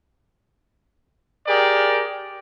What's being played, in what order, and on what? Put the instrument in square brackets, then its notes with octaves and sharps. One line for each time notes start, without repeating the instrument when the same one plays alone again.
[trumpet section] G4 G#4 A#4 D5